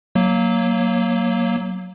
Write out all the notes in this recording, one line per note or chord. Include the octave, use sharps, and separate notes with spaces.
F#3 A#3